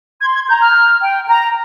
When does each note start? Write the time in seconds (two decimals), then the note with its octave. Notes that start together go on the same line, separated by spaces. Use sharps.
0.21 C6 G#6
0.35 G#6
0.48 A#5 G6
0.62 F6
1.02 G5
1.29 A#5